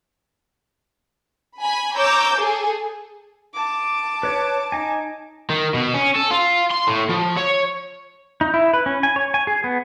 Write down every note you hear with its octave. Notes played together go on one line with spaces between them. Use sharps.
G#5 B5
C#5 A#5 D6 E6 G6
G#4 A4
A5 D6
B4 C#5
D#4 G#5
D#3
B2
C#4
A4
F4
C6
A2
F3
C#5
D#4
E4
B4
C#4
G#5
C#5
G#5
G#4
B3